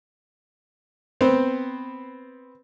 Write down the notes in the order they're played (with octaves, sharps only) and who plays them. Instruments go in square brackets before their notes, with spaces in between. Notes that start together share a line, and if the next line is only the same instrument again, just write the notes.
[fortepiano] B3 C4 C5